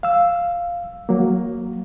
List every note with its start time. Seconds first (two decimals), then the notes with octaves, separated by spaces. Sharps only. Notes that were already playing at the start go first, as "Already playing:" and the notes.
0.03 F5 E6
1.09 F#3 A#3